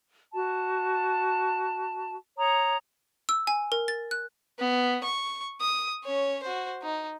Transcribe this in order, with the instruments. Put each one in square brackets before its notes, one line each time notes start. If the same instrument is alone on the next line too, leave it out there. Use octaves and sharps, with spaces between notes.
[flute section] F#4 A5
C#5 A#5 D#6
[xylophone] E6
G#5
A#4
A6
F#6
[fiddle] B3
C#6
D#6
C#4 C#5
F#4 C5
D#4